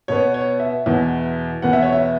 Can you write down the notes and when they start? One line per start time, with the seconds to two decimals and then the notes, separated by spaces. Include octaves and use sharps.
0.08 B2 B3 C#5
0.34 C#5
0.59 E5
0.86 E2 B2 B3
1.62 E2 B2 B3 F#5
1.73 E5
1.82 C#5
1.92 E5